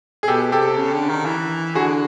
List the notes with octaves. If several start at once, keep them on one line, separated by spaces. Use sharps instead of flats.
G#4
B2 G4 A4
C3 G4 A4
C#3
D3
D#3
E3
D3 F#4 G#4